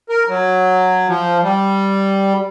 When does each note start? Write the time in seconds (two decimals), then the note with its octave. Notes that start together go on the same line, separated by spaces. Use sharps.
0.09 A#4
0.29 F#3
1.08 F3
1.43 G3